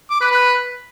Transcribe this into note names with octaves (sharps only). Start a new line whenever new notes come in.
D6
B4
B4